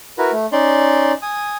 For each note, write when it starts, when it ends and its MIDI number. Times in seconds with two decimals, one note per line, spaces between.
0.18 0.31 64
0.18 0.31 66
0.18 0.31 70
0.18 0.31 71
0.32 0.46 57
0.52 1.12 61
0.52 1.12 63
0.52 1.12 74
0.52 1.12 84
1.22 1.57 80
1.22 1.57 87